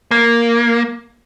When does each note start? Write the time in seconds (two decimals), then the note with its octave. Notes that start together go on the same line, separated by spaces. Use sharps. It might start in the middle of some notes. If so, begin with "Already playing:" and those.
0.11 A#3